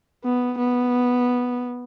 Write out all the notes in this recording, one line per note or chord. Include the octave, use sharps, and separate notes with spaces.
B3
B3